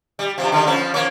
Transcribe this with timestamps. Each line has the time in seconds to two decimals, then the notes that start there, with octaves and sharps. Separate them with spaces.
0.19 G3
0.38 G2 C3 F3
0.52 D3 D#3 G3
0.67 F3 B3 C#4
0.94 F3 A#3 C#5